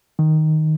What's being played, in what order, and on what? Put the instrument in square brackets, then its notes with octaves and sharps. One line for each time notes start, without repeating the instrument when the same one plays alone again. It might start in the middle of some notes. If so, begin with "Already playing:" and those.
[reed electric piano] D#3